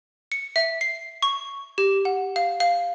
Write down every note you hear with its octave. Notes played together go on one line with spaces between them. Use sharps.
C#7
E5
C7
C#6
G4
F#5
F5
F5